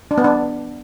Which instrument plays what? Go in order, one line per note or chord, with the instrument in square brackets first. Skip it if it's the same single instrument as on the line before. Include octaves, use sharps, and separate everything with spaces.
[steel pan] D4
B3
D4